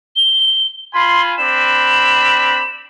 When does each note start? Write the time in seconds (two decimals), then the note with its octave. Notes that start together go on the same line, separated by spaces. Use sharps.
0.16 G7
0.94 F4 G#5 B5 C6
1.38 C4 D4 B5 E7